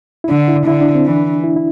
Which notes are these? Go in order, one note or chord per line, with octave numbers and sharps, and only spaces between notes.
E4
D3 D4
E4
D3 E4
D4
C4
E3 D4
E4
E4